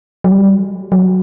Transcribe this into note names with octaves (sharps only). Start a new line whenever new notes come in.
F#3
G3
F#3